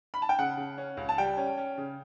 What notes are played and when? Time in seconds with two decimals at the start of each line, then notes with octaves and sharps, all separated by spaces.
0.14 B5
0.22 A5
0.29 G5
0.39 C#3 F#5
0.57 C#3
0.78 C#4
0.97 C#2
1.09 A5
1.18 G3 G5
1.37 C#4
1.57 C#4
1.78 C#3